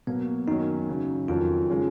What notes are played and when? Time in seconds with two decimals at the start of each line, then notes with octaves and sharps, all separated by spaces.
0.07 B2 F#3 A#3 B3
0.48 F#2 D#3 F#3 C#4 D#4
0.89 F#2 C#3 F#3
1.28 F2 D#3 F#3 C#4 F4
1.70 C#3 G#3 C#4